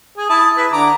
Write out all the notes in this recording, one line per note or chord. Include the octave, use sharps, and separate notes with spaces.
G#4
E4 A5 D#6
E4 B4
D3 A#5 D6